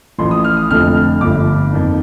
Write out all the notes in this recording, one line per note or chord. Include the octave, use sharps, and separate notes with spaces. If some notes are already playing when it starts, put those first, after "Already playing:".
A1 A2 F3 C6
D#6
F6
D#6
F1 F2 D3 F3 A3 F6
F6
G1 G2 D3 F3 A3 D6
F2 D#3 A#3 D#4